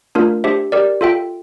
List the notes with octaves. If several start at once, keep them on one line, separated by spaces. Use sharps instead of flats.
A3 D4 F4 A#4
D4 G4 C5 E5
G4 A#4 D5
F4 A4 E5 G5